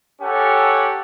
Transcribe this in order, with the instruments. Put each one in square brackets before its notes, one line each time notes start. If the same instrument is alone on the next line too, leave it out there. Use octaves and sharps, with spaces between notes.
[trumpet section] C#4 G4 A4 F#5